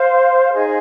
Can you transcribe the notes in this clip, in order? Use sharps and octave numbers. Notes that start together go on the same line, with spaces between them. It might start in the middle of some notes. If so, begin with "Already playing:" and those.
Already playing: C5 F5 C6
D#4 G#4 D#5 G#5